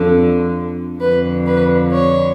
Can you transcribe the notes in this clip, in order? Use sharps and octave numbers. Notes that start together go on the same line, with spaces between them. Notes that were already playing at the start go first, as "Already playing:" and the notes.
Already playing: F2 D3
F2 D3 B4
B4
C#5